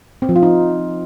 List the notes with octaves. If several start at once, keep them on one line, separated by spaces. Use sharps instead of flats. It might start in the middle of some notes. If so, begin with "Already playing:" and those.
C4
F3
F4
D#4